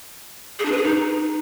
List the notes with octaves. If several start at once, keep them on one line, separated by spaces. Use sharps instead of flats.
G#4
D4
B4
G#4
D#4